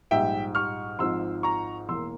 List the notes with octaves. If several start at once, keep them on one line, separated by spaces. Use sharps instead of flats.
A#1 G#2 G3 E5 G5
C#6 F6
G#1 G#2 F3 C6 E6
A#5 C#6
E1 E2 E3 A#3 C6 E6